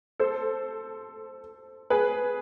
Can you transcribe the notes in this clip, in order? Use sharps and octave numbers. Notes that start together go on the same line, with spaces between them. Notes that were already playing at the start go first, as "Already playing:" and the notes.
A4 C5
G#4 B4